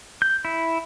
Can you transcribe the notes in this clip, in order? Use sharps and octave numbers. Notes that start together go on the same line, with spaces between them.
G6
E4